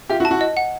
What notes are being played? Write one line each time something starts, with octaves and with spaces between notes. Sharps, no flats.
F4 G4 E5
E4 F#4
A5
E4 F#4
D#5
F#5